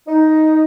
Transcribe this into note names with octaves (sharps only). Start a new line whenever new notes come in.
D#4